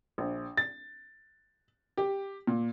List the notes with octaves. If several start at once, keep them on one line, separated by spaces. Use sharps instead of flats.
A#1
A6
G4
A#2